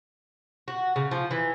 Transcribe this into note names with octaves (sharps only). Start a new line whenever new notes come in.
F#4
C#3
F3
E3